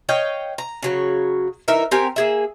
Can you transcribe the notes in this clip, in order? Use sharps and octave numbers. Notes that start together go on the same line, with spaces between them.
C#5 D#5 F5 G5
A#5
C#3 F#3 C#5
E3 D#4 A#4 E5
C4 G4 A#4 G#5
A#3 G#4 E5